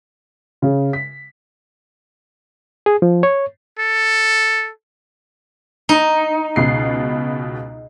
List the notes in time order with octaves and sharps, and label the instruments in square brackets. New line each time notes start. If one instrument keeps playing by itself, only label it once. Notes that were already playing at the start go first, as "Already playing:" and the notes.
[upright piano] C#3
B6
[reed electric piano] G#4
F3
C#5
[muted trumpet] A4
[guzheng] D#4
[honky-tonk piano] C#2 B2 C7